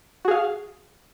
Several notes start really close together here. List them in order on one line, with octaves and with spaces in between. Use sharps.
F#4 G#4 F5